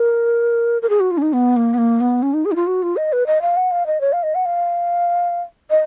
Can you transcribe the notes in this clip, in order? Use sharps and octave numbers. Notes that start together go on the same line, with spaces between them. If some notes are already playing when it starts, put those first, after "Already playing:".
Already playing: A#4
A#4
G#4
F#4
F4
C#4
D#4
B3
A#3
B3
A#3
B3
C#4
D#4
G#4
D#4
F4
F#4
F4
D#5
B4
D#5
F5
F#5
F5
D#5
C#5
F5
D#5
F#5
F5
D#5